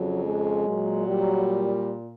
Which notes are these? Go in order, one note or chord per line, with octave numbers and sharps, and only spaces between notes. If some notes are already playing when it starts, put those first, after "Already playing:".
Already playing: F2 C#3 F#3
G#3
A#2 F#3
G3